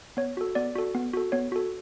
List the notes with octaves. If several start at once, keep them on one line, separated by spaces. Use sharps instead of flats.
B3 C#5
F#4 A4
B3 D5
F#4 A4
B3
F#4 A4
B3 C#5
F#4 A4